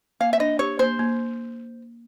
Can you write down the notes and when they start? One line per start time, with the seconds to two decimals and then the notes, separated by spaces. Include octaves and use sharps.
0.20 A#3 F5
0.33 E5
0.40 D4 D#5
0.59 G4 C#5
0.79 A#3 C5
0.99 A#3